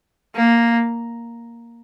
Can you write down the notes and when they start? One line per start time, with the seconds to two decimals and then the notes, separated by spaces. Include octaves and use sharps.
0.36 A#3